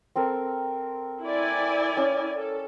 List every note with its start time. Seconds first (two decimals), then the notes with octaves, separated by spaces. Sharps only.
0.16 C4 A4 A#4
1.24 E4 D5 G#5
1.97 C#4
2.36 A4